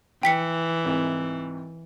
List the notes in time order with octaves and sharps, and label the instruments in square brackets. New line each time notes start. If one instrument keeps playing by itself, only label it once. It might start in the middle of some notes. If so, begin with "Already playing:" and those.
[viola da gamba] E3 [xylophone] G5 B6 C#7
[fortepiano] C2 G#2 C3